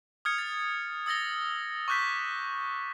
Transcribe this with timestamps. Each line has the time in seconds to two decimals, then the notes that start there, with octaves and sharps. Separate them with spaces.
0.25 D#6 F6 G#6 C#7
0.38 A6
1.06 D#6 E6 A6 A#6 G7
1.88 C#6 D6 F#6 G6 B6